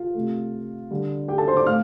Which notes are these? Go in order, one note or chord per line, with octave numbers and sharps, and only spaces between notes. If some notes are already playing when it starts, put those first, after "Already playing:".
Already playing: F4 F5
C3 A3
D3 G3
G4 G5
A4 A5
C5 C6
D5 D6
A2 F5 F6